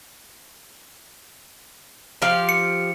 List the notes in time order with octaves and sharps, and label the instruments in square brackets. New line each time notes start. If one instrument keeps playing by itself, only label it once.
[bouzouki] F3 G4 F5
[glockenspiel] C#7